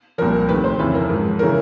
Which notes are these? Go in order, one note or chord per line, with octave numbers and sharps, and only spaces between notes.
C2 A#2 F3 A#4
D2 C3 D#3 B4
C5
F2 C#3 E3 B4
A#4
G#2 F3
C#3 E3 A#4